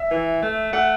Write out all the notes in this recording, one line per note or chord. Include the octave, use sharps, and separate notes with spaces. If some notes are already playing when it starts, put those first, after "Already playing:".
Already playing: E5
E3
A3
A3 F#5